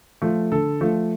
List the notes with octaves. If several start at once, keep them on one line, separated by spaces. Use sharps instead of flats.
F3 A3
D3 A4
F3 A3